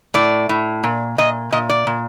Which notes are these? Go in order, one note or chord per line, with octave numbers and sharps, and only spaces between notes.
A2 D5
A2
A#2
A#2 D#5
A#2 D#5
D5
A#2